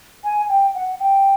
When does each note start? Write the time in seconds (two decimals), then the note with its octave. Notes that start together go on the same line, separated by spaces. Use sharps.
0.24 G#5
0.49 G5
0.75 F#5
1.00 G5